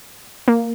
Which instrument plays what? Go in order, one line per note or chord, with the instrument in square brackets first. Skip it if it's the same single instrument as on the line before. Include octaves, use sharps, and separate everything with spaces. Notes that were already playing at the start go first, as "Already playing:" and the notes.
[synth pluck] A#3